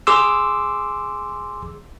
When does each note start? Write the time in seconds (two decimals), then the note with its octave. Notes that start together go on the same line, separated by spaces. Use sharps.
0.07 G#4 C6 D6 E6